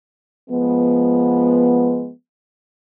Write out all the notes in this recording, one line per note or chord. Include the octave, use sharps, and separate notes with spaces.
F3 G#3 B3